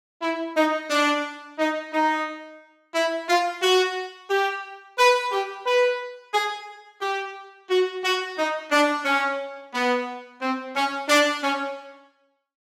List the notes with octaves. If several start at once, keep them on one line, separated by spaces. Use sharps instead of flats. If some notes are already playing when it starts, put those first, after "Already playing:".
E4
D#4
D4
D#4
D#4
E4
F4
F#4
G4
B4
G4
B4
G#4
G4
F#4
F#4
D#4
D4
C#4
B3
C4
C#4
D4
C#4